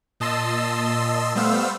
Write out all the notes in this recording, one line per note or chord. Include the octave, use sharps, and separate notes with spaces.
A#2 D#5 A5 C6 E6
G3 A3 B3 C5 F5 E6